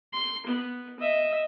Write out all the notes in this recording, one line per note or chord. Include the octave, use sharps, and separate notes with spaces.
C6
B3
D#5 E5